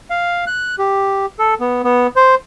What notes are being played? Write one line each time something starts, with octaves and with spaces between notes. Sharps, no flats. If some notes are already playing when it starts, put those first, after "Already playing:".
F5
F#6
G4
A4
B3
B3
C5